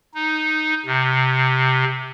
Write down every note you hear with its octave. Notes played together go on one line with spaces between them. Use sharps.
D#4
C3